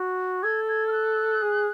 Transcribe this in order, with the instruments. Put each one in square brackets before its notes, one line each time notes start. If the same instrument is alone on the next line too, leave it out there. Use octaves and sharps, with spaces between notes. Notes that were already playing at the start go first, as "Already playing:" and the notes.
Already playing: [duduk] F#4
[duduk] A4 [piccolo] G#6
[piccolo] G#6
F6
F#6
[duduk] G#4